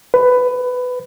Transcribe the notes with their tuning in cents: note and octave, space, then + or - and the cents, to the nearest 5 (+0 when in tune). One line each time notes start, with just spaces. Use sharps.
B4 +15